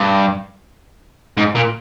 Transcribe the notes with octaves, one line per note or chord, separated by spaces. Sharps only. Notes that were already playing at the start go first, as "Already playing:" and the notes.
Already playing: G2
G#2
A#2